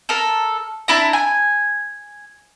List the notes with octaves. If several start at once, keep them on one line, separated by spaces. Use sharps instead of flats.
A4 A#4
D4 E4 A#5
G#5